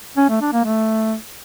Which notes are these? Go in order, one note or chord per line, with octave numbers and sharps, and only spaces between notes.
C#4
A3
D4
A#3
A3